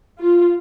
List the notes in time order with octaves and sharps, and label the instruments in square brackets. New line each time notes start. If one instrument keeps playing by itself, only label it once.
[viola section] F4